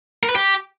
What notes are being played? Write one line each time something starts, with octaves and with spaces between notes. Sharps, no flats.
A#4
B4
G4